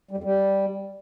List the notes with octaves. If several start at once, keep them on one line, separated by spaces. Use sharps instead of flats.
G3
F2
G3